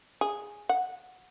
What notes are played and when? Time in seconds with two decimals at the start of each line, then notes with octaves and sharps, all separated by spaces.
0.21 G#4
0.69 F#5